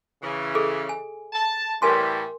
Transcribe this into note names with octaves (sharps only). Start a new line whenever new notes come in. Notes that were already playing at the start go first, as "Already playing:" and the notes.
C#3 E3
G#4 A4 D#5
G#5
A5
A2 E3 G3 A#4 G#5 C6